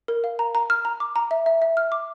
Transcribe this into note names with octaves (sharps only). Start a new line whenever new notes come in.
A#4
F5
A#5
A#5
F6
A#5
D6
A#5
E5
E5
E5
F6
D6